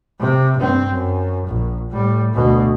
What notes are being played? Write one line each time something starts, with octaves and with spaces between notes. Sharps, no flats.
C3
G2 C4
F#2
A#1
A2 G3
D2 B2